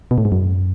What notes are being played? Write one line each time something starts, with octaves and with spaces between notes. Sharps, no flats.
B2
A2
G#2
F#2